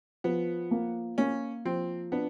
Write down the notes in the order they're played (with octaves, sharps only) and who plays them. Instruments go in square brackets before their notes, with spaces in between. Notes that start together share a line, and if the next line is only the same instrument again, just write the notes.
[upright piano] F3 [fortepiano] B3
[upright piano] A#3
[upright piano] A#3 [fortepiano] C#4
[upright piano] F3 [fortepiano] C4
[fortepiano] B3 [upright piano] D4